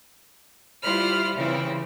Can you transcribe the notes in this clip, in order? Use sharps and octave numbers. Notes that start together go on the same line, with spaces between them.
G3 E4 F4 C5 B5 F6
C#3 E3 C4 E4